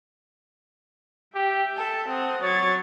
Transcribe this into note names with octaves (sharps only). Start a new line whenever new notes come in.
G4 E5 G5
A4 A5
C4 F#5 D#6
F#3 C#5 G#6 A6